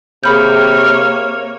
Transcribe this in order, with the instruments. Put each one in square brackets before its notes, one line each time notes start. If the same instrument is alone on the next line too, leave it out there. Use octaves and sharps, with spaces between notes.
[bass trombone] C3 [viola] A#3 C#5 [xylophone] G#4 B5 G6 [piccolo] F6